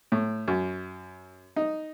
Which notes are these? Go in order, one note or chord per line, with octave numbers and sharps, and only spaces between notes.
A2
F#2
D#4